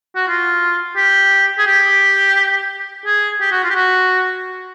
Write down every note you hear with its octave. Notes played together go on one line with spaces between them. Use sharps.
F#4
F4
G4
G#4
G4
G#4
G4
F#4
F4
G4
F#4